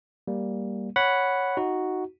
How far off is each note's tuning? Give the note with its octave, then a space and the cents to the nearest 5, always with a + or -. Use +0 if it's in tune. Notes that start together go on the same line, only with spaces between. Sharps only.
G3 +0 A#3 +0
C#5 +0 F#5 +0 B5 +0
D#4 +15 F#4 +0